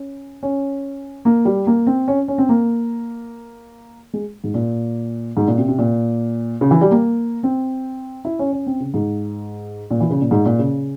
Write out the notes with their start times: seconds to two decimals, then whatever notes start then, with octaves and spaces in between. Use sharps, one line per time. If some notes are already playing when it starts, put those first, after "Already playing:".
Already playing: C#4
0.43 C#4
1.25 A#3
1.45 G3
1.67 A#3
1.87 C4
2.08 C#4
2.28 C#4
2.38 C4
2.49 A#3
4.13 G#3
4.44 G#2
4.54 A#2
5.37 G#2
5.48 A#2
5.58 C3
5.68 C3
5.78 A#2
6.61 C#3
6.71 E3
6.81 G3
6.91 A#3
7.43 C4
8.25 E4
8.39 C#4
8.53 C#4
8.67 C4
8.80 C#3
8.94 G#2
9.91 A#2
10.00 E3
10.11 C#3
10.21 A#2
10.31 G#2
10.46 A#2
10.59 C#3